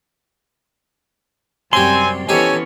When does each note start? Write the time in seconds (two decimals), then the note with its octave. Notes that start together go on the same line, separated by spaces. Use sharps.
1.73 F#2 C3 G3 C4 G4 C#5 G#5 C6
2.29 E3 B3 C#4 D#4 G4 A4 C#5 G#5